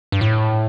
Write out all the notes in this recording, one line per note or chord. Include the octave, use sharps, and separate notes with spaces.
G2
A2